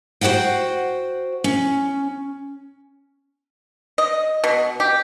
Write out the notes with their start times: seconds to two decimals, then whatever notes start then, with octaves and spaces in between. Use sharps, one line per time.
0.21 F#4 G#4 C5 F#5 G5
1.44 C#4
3.98 D#5
4.44 B2
4.80 G4